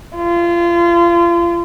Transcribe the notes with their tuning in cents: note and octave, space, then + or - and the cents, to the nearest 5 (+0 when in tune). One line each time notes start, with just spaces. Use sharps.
F4 -30